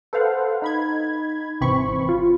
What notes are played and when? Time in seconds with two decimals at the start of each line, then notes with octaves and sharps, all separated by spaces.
0.13 A4 B4 C5 F5 F#5
0.62 D#4 B5 G#6
1.61 G#1 C3 E3 C4 B5 C#6
2.09 F4